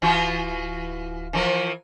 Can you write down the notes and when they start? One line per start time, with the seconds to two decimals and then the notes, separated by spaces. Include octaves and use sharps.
0.02 D1 E3 F4 F#4
1.33 E3 F3 A#4